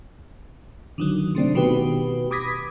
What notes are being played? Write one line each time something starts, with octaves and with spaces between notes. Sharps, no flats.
D3 D#3 F#3
C3 A3 C4 D4
B2 D#3 F#4 G4 B4
B5 D6 D#6 G#6 A#6 B6